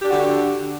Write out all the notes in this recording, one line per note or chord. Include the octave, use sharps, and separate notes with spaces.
D3 D4 F#4 G4